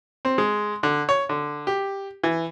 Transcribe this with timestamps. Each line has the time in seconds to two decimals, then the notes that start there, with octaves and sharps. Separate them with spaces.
0.25 C4
0.38 G#3
0.83 D3
1.09 C#5
1.29 D3
1.67 G4
2.24 E3